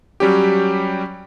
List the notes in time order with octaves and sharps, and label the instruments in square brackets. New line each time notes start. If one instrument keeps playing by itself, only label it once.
[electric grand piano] F#3 G3 C#4 G4